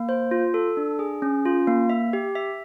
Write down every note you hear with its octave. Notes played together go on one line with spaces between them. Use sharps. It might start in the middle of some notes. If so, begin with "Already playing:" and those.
Already playing: A#3
C5
F4
A4
D4
G#4
C#4
F4
A#3
E5
G4
E5